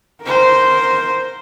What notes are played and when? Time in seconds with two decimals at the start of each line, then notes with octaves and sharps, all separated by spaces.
0.22 A#4 C5